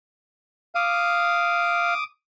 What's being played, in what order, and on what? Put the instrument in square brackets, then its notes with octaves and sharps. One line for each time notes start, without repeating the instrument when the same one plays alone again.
[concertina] F5 [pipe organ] D6 D#6